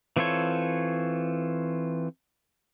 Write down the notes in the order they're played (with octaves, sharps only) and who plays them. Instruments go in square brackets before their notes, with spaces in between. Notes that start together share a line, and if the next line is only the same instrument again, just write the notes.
[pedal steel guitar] E3 C4 F4 A4 C#5